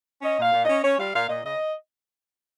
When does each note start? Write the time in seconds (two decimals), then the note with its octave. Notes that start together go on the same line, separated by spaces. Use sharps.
0.22 C#4 D#5
0.38 A#2 F5
0.53 A#2
0.63 D#5
0.68 C#4
0.83 C#4 C#5
0.99 G3 F5
1.14 A#2 F5
1.29 A#2 D#5
1.44 C#3 D#5